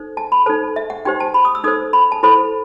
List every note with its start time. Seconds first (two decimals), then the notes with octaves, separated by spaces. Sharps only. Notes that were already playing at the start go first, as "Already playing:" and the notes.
Already playing: D#4 A4 C5
0.17 A5
0.32 B5
0.46 D#4 A4 C5 A5
0.76 E5
0.90 F#5
1.05 D#4 G4 C5 G5
1.20 A5
1.34 B5
1.45 D#6
1.55 E6
1.64 D#4 A4 C5 D#6
1.93 B5
2.12 A5
2.23 E4 A4 C5 B5